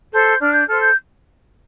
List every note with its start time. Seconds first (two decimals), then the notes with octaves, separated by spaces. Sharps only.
0.12 A4 C5 G6
0.40 D4 F6
0.53 G6
0.66 A4 C5 F6
0.81 G6